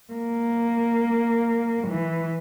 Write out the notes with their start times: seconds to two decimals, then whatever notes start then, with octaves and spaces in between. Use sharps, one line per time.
0.12 A#3
1.88 E3